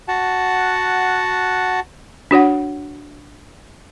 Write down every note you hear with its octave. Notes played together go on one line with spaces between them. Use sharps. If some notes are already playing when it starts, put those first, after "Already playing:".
F#4 F#5 A5
D4 F#4 C#5 F#5